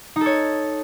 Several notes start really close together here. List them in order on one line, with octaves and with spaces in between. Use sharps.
D#4 A4 C#5